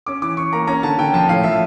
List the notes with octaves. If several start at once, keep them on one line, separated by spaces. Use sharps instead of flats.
C#4 D6
E3 D6
C#4 C#6
A#3 A#5
C#4 A#5
D3 A5
D3 G5
F3 A5
A2 F5
F3 E5